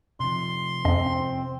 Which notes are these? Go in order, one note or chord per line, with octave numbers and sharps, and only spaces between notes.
C3 F3 C6
F2 C4 C#4 D#5